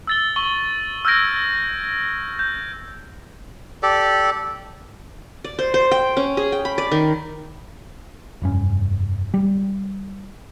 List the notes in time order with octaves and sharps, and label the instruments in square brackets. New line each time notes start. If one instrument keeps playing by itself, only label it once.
[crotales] E6 A6 G7
C#6 F#7 G7
E6 F6 G6 G#6 A#6 D7
G6
[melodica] G4 A4 D5
[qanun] D5
C5
C5
G5
C#4
G#4
G5
B5
D5
D#3
[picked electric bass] F1 G2 C#4
G3